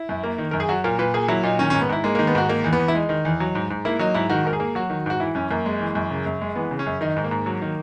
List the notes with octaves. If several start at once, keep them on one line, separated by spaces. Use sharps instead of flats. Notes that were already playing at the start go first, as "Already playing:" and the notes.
Already playing: E4
F#2
A#3
D#3
F#2 A#4
G#4
F#3 F#4
A#2 A#4
A#2 B4
A#3 G#4
F#3 E4
A#2 D#4
D#3 C#4
C#4
G#2
B3
G#2 E4
G#3 A#3
A#3
D#3
B3
G#2 F#4
D#3 A#3
E2
B3
E2
E4
G#3 D#4
D#3
E2
F#3
G#2
G#2
A#3 E4
F#3 D#4
G#2 E4
D#3 F#4
G#2 A#4
G#4
A#3
F#3 F#4
D#3
G#2 F#4
E3 E4
F#2 C#4
F#2 A#3
G#3
E3
F#2
C#3
F#2
G#3
E3 B3
C#3
C#4
F#2
D#3 D#4
G#2
A#3
G#2
F#3
D#3